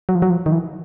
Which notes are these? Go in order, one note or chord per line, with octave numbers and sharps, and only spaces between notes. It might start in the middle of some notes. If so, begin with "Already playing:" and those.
F#3
F3
F#3
F3
D#3
E3